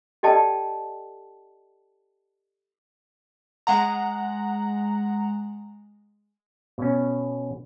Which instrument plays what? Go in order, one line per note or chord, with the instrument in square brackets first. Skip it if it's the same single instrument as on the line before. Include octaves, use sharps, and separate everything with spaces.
[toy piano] G4 A4 D5 D#5 G5 A5
[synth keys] G#3 F#5 A#5
[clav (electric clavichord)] B2 C#4